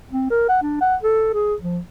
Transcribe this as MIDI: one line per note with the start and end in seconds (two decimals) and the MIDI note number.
0.11 0.27 60
0.30 0.47 70
0.49 0.58 78
0.62 0.80 62
0.81 0.96 78
1.03 1.29 69
1.33 1.55 68
1.62 1.79 53